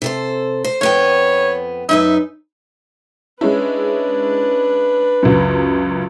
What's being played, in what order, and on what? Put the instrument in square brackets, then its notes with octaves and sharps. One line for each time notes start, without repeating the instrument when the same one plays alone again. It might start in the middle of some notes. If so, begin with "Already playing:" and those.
[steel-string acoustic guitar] C3 A4 C5
C5
[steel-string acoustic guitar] F2 B3 G5 [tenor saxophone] C#5
[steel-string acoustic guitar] F#2 D#4 B4 [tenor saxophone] E5
[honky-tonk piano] G#3 C#4 E4 [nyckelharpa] D4 B4
[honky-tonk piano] C#2 F#2